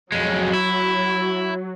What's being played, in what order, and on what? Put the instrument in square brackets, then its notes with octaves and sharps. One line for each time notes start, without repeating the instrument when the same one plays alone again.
[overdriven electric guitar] F2 G#3 [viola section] F#3
[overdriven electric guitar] E4